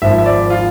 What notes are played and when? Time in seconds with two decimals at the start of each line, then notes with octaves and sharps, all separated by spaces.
0.02 G#1 G#2 F3 E5
0.18 E5
0.26 D5
0.50 F4